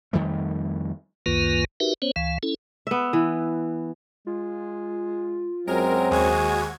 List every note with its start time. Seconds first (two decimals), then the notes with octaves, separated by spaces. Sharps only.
0.13 F2 D#3 G3 A3
1.26 C#2 F#2 D#3 A#3 F4 B4
1.80 D#4 F#4 G4 A#4 B4 E5
2.02 B3 C#4 C5 C#5
2.16 C#2 E3 F5
2.43 C#4 E4 A4
2.87 B3 E5
3.13 E3
4.27 G#3 F4
5.67 F#2 F#3 G#3 C4 A#4
6.11 D#2 G#3 F#4 C5 G#6